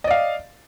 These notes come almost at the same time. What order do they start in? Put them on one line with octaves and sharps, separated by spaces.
D#5 D5 F5